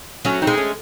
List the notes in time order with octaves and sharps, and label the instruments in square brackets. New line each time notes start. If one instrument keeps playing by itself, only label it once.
[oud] F#3 [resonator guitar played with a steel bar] A3 C#4
[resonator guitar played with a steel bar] C4 D#4
[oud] G#3
[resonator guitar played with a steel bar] A3 C#4